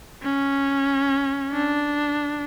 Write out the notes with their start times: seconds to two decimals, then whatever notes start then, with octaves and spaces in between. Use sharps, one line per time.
0.23 C#4
1.52 D4